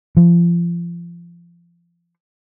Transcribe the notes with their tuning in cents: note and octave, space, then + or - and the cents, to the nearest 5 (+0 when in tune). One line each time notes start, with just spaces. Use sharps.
F3 -30